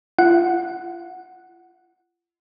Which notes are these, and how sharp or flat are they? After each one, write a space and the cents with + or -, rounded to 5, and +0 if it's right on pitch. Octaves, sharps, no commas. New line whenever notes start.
F4 -35 F#5 +0